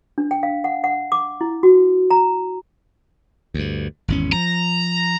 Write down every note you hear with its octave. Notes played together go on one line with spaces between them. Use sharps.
D4
G5
F5
F#5
F#5
D6
E4
F#4
A#5
D2 G2
G#1 E2 C#4
F3 A#5